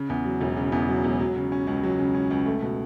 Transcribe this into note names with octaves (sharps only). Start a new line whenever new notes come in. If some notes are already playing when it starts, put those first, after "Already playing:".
Already playing: C#3
E2
F#3
E1
C#3
E2
F#3
E1
F#3
C#3
C#4
C#2
F#3
C#3
C#4
C#2
A3
B2